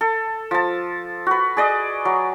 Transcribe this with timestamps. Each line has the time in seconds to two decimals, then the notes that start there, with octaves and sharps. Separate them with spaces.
0.01 A4
0.51 F3 A5
1.27 F#4 B4
1.57 G#4 D5 D#5
2.05 F#3